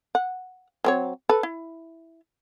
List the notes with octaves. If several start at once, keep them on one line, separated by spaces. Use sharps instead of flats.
F#5
F#3 C4 C#5
A4 B4
E4